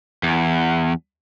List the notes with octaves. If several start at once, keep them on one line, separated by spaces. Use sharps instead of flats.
E2